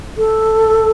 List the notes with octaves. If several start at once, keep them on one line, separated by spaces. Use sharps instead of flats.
A4